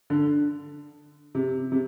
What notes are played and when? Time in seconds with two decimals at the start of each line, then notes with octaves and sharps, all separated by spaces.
0.10 D3
1.35 C3
1.72 C3